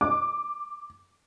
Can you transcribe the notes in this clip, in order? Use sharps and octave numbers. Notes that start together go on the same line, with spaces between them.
D6